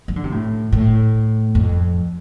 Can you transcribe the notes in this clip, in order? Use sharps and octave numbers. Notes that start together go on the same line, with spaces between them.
F3
D3
C3
A2
A2
F2